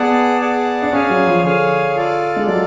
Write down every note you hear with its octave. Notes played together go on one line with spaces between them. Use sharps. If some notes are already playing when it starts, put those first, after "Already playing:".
Already playing: B3 G#4 D5 F#5 A5
G#4 D5 F#5 A5
D4
C#4 G#4 C#5 F5 G#5
F#3
F3
D3 G#4 C#5 F5 G#5
F4 A4 D5
G#3
F#3 F4 A4 D5